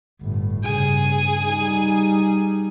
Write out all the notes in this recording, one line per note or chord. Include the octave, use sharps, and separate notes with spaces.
G1 A2
G2 C#3 G#4 G#5
G3 D#4